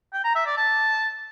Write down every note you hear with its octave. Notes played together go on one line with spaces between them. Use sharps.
G5
A#5
E5
D5
A5